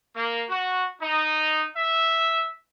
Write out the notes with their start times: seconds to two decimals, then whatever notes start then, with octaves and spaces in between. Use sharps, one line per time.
0.15 A#3
0.49 F#4
1.01 D#4
1.76 E5